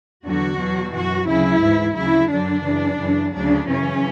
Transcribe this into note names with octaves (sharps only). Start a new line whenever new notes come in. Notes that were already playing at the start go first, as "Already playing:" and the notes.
E2 D3 F#3 F#4
E2 B2 F#3
F#2 E3 F#4
D2 C#3 F#3 E4
G#2 E3
D2 C#3 F#3 E4
F#2 D3 F#3 D4
F#2 C#3 E3
F#2 C#3 E3
D2 C#3 F#3 D4
F#2 C#3 E3 C#4